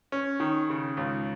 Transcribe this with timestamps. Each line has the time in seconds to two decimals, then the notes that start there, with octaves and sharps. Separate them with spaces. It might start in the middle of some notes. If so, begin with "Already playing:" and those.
0.12 C#4
0.40 D#3
0.70 C#3
0.97 C#2